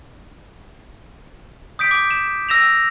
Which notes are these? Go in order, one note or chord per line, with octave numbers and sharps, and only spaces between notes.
D#6 G6 B6 D7
D6
E7
E6 A#6 E7 F7